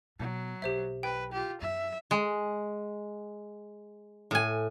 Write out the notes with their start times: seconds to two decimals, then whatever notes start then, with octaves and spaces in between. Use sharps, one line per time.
0.20 B2 F#3
0.62 B1 G4 C5 E5
1.03 B4 G5
1.32 F4 G4
1.62 F#2 E5
2.11 G#3
4.31 A2 G#5